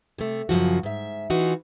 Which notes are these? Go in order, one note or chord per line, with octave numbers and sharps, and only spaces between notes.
C3 A3
F#2 C#3 F3 F#4
G#2 E5
E3 D#4 F4 F#4